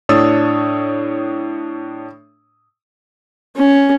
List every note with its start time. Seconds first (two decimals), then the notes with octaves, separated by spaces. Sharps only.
0.09 A2 D4 C#5 D#6 E6 A6
3.57 C#4